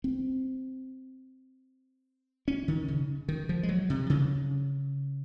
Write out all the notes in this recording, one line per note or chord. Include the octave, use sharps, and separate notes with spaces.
C4
C#4
D#3
C#3
D#3
F3
G#3
F#3
C3
C#3